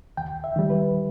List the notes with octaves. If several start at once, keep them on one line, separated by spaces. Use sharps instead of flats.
D#2 G5
E5
D#3 G3
B4